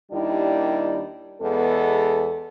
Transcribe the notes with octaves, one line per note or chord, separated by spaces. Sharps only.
D#2 D#3 G3 D4 E4 G4
E2 G#3 B3 A4